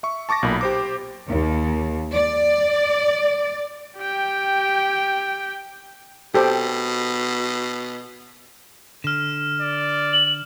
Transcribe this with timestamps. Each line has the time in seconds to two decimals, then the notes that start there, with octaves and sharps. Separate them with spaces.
0.03 E5 C#6
0.29 A5 C#6 D6 A6 A#6
0.43 B1 A#2 B5
0.61 G4 C5 D6
1.28 D#2
2.12 D5
3.98 G4 G5
6.34 B2 G4 A4 C5
9.04 D3 F6 E7
9.61 D5
10.13 F#7